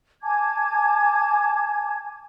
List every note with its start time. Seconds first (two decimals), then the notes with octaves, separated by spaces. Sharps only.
0.23 G#5 A5 D6 G#6